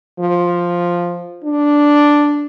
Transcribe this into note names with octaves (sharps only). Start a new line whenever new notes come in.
F3
D4